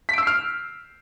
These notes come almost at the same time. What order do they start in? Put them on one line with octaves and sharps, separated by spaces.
B6 D7 E6 C7 F6